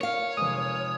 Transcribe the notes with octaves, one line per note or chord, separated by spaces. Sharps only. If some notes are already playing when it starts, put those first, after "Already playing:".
A#4 C#5 F5
F1 G#3 D#6